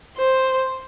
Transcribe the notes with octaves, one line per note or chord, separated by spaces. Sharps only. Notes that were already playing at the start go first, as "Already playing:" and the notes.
C5